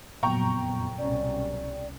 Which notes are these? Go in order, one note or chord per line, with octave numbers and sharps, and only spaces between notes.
F#1 F2 A#2 F#3 B3 G5 A#5 C#6
C2 B2 C#4 D5